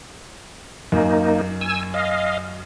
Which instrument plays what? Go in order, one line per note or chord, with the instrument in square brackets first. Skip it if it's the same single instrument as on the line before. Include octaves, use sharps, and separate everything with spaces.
[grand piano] F#2 [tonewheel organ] A#3 D#4
[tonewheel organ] G#5 E6
D#5 F5